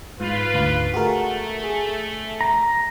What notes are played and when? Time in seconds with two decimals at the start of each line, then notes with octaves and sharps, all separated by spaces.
0.20 G#2 F4 B4
0.54 D2 G#2 F5
0.94 A3 F#4 G#4 A#4
1.64 G#4
2.41 A#5